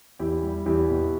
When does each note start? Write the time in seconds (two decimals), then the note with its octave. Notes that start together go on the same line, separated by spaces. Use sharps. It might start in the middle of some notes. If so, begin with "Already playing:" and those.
0.19 E2 E4 G4
0.43 G3
0.66 E2 E4 G4
0.90 B2